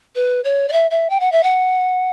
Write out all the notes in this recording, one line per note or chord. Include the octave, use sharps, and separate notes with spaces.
B4
C#5
D5
E5
E5
G5
F#5
E5
F#5